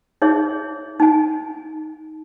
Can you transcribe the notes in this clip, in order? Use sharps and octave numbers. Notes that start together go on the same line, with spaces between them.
D#4 G#4 C#5 E5
D#4 G#5